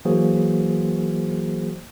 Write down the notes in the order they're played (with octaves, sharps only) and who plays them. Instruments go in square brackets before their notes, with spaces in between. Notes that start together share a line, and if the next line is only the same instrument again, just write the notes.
[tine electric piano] E3 F#3 A#3 F#4 G#4 C5